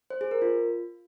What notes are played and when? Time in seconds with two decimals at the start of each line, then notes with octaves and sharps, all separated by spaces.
0.10 C5
0.21 G#4
0.31 A#4
0.42 F4